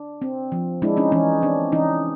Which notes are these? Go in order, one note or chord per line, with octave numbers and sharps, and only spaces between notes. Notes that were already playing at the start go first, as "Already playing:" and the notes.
Already playing: D4
C4
F3
G#3 D4 E4
C#4 D#4
E3 C#4 D#4
C4 D4
E3 C#4 D#4